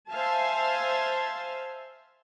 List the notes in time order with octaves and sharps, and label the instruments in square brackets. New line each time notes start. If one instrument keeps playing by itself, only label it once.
[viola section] C5 E5 F5 G#5 A5